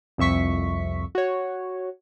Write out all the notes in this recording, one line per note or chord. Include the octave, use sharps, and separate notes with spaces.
C2 F2 E5 C#6 B6
F#4 C#5